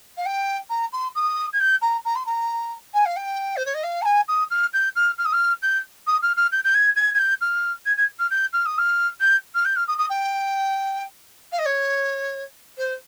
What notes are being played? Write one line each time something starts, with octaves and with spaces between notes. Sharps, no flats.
F5
G5
A#5
C6
D#6
G#6
G6
A#5
A#5
C6
A#5
G#5
F5
G5
C5
C#5
D#5
F5
A#5
G#5
D#6
F6
G6
F6
F6
D#6
F6
G6
D#6
F6
F6
G6
G6
G#6
G#6
G#6
G6
F6
G#6
G#6
F6
G6
F6
D#6
F6
G6
F6
G6
F6
D#6
D#6
G5
F5
D#5
C#5
C5